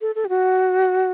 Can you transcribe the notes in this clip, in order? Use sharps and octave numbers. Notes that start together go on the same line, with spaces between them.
A4
A4
G4
F#4